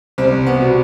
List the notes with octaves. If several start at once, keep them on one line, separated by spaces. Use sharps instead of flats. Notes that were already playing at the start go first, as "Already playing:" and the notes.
C2 C4
B3
B2